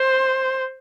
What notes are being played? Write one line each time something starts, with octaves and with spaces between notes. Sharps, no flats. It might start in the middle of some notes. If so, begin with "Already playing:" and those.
Already playing: C5